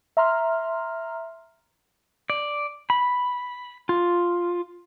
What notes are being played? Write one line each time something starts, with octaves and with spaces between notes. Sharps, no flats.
E5 A#5 C6 F6
D5
B5
F4